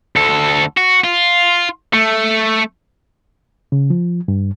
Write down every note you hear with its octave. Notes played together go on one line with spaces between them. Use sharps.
D2 A4
F#4
F4
A3
C#3
F3
G2